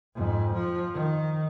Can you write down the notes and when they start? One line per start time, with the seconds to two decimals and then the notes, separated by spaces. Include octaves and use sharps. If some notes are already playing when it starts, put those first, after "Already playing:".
0.15 F2 G#2
0.54 F3
0.94 D#3